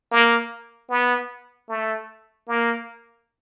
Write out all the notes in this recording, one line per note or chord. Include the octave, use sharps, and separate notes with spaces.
A#3
B3
A3
A#3